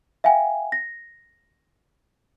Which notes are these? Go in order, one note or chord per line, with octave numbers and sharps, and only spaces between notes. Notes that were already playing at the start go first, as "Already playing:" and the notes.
E5 F5 G5 G#5
A#6